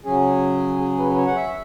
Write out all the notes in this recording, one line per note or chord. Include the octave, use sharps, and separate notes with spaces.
C#3 F#3 C#4 G#4
G#4
B4
B4
C#5
F#5
E5